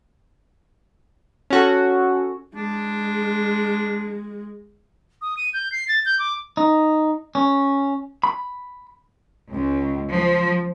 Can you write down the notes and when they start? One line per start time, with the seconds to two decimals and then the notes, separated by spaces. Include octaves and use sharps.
1.50 C#4 F#4 A4
2.56 G#3 D4
5.22 D#6
5.37 D#7
5.54 G6
5.72 C7
5.88 A6
6.06 G6
6.19 D6
6.57 D#4
7.35 C#4
8.24 B5
9.50 C#2
10.13 F3